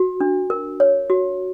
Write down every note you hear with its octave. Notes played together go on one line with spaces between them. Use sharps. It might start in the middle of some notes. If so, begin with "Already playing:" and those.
Already playing: F#4
D4
A#4
C#5
F#4